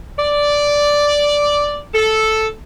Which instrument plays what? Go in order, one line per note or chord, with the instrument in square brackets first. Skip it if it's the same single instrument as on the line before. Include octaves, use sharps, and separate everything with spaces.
[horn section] D5
A4